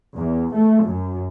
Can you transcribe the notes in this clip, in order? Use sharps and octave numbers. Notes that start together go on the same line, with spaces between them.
E2
A3
F#2